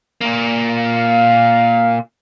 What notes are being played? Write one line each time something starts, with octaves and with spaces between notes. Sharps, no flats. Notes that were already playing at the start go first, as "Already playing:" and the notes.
A#2 A#3
F5